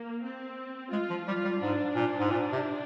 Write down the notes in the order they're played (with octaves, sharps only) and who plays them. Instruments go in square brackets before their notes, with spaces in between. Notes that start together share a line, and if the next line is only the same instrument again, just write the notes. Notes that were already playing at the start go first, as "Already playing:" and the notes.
Already playing: [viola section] A#3
C4
[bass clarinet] G#3 [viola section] F4
[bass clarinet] F3
[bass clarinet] G3 [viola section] F4
[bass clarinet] G3
[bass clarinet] G#2 [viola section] D4
[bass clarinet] A#2
G#2
A#2
C3